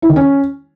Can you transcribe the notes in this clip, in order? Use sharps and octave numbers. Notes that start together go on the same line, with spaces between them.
E4
D#3
C#4